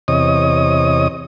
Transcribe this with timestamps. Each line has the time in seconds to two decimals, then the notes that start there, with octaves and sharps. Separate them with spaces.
0.08 E2 C3 C#5 D#5 D#6